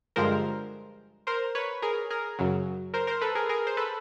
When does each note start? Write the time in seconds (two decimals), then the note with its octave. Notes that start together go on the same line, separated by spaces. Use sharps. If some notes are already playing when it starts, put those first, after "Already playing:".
0.16 G2 D3 F3 G#3 A#4 C5
1.27 A#4 C5
1.55 B4 C#5
1.82 G#4 A#4
2.10 G#4 A#4
2.39 F#2 C#3 F#3
2.94 A#4 C5
3.07 A#4 C5
3.21 A4 B4
3.35 G#4 A#4
3.49 G#4 A#4
3.67 C5
3.77 A4 B4